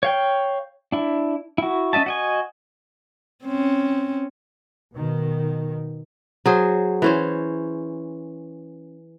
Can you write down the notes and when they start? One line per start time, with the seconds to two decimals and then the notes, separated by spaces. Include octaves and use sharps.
0.03 C#5 F5 G5
0.92 D4 E4
1.58 E4 F#4
1.93 C#4 D4 D#5 E5 A5
2.06 F#4 D#5 G#5
3.45 C4 C#4
4.95 B2 D#3
6.46 F#3 G#4 C5
7.02 E3 C#4 C5